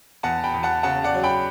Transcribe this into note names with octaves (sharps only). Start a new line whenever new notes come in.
E2 F#5 A5
G5 B5
E2
F#5 A5
C#3 F#5 A5
D5 F#5
F#3
G5 B5